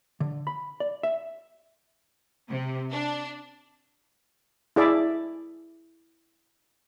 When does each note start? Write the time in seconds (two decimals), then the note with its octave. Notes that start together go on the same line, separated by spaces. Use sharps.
0.20 D3
0.47 B5
0.80 D5
1.03 E5
2.49 C3
2.92 D4
4.76 E4 G#4 D5 E5